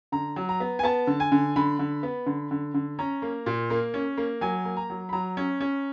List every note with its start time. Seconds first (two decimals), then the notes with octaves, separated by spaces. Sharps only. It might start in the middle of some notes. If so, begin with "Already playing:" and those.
0.12 D3 A#5
0.36 F#3
0.49 A#5
0.60 B3
0.79 G#5
0.83 B3 A5
1.07 D3
1.20 G#5
1.32 D3
1.56 D3 B5
1.79 D3
2.03 B3
2.26 D3
2.51 D3
2.74 D3
2.99 C#4 A#5
3.22 A#3
3.46 A#2
3.70 A#3
3.94 C#4
4.18 A#3
4.41 F#3 G#5
4.65 A#3
4.77 A#5
4.90 F#3
5.09 B5
5.13 F#3 A#5
5.37 C#4
5.61 C#4